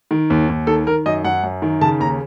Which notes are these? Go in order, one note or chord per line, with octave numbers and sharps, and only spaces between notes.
D#3
D#2
D#2
D#3 A4
D#3 A#4
F#2 D#5
F#2 F#5
F#2
D#3
C#3 A5
D#2 A#5